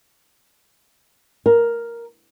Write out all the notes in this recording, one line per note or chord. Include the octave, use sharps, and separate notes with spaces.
A#4